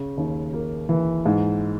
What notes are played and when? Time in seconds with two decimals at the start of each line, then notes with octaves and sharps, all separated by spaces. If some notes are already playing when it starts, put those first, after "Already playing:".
Already playing: C#3
0.17 D#2
0.53 A#3
0.89 E3
1.26 G#2